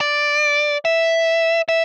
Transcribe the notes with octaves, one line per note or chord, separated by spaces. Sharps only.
D5
E5
E5